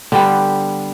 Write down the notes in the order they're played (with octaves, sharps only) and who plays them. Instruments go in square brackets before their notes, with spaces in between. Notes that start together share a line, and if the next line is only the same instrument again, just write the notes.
[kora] D3 G3 B3 G4